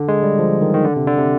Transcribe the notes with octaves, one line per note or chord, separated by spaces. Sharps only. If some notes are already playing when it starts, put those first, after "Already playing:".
Already playing: D3
G#3
G3
F3
D#3
D#3
D3
C3
D3
C3